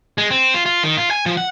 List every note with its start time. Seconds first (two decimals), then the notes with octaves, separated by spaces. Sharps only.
0.18 G#3
0.30 C4
0.54 F4
0.66 F4
0.83 D#3
0.97 F4
1.11 G#5
1.26 F3
1.37 F#5